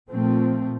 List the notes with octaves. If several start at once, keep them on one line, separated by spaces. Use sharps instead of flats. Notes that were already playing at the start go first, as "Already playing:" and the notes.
A#2 F3 A3 C4